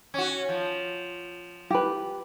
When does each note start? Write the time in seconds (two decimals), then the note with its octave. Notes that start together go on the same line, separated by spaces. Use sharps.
0.14 C#4 F#4
0.49 F3
1.70 G4 B4